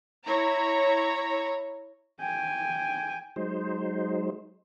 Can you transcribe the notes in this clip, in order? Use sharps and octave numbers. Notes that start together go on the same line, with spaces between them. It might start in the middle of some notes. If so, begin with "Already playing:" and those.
E4 C#5 A#5
G5 G#5
F#3 G#3 D#4 C5